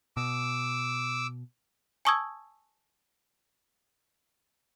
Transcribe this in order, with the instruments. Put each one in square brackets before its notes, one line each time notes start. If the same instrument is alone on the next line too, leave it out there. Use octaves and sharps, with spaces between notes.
[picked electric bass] B2 [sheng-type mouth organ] D6 E6
[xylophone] G#5 A5 C#6 D#6 E6 G#6